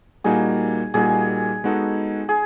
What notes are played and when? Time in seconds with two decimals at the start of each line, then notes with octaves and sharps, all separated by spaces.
0.24 A#2 G3 A#3 D#4 F#4 G#4
0.94 A#2 G3 A#3 D#4 F#4 G#4
1.64 G#3 B3 D#4 F#4 A4
2.29 G#4